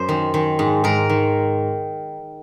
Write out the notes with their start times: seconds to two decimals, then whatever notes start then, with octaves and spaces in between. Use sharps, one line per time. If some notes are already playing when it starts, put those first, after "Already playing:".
Already playing: F#2 C5
0.09 D#3
0.34 D#3
0.59 G#2
0.84 G#2 A#4
1.09 D#3